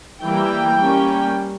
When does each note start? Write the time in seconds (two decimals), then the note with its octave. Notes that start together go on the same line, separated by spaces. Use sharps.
0.22 E3 G3 A#3 G5
0.79 G3 A#3 C#4